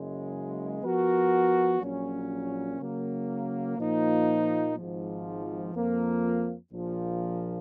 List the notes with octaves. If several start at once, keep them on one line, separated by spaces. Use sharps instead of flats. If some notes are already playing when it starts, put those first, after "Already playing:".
Already playing: F#1 F#2 C#3 G#3
F3 B3 F#4 A#4
A#1 A#2 F#3 C#4
C#3 F#3 A#3
A#2 F3 A#3 D#4
G#1 G#2 F3
F2 F3 A#3
A#1 A#2 F3